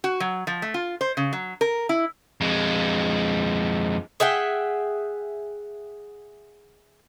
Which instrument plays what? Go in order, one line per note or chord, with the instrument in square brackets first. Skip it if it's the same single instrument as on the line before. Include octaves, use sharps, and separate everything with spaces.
[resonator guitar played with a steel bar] F#4
F#3
F3
A3
F4
C5
C#3
F#3
A#4
E4
[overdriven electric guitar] F2 G#3
[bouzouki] G#4 E5 F#5 G5